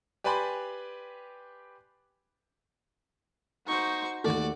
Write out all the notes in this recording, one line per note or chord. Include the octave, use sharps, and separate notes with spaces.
G4 B4 D5 G#5 B5 C6
D#4 F#4 C5 C#6
D#2 A3 F#4 D5